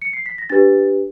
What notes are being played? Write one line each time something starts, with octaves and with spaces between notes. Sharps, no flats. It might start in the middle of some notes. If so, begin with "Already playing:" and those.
C#7
C7
B6
A#6
D4 G4 B4 A6